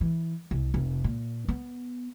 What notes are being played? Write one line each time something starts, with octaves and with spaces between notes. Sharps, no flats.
E3
C2
F1
A#2
B3